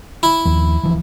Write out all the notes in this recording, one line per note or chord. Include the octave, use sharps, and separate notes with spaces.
E4
D#2 F3
D1 E3 F3